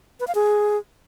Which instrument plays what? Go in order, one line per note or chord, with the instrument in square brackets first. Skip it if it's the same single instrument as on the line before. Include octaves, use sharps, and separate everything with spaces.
[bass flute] B4
F5
G#4